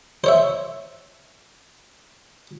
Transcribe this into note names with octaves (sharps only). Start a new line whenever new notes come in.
C5 C#5 E5